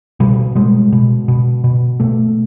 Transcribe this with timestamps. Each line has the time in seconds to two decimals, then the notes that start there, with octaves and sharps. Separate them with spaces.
0.20 B2 G3
0.55 B2 G#3
0.92 B2
1.28 B2
1.64 B2
2.00 B2 A3